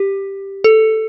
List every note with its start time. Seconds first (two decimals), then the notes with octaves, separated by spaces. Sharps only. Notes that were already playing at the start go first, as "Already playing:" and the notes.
Already playing: G4
0.64 A4